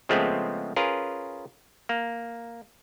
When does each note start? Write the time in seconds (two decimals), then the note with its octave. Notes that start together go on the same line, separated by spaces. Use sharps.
0.09 C#3 F3 G#3 A3 B3 C4
0.76 C#4 F4 G#4 A#4 B4
1.89 A#3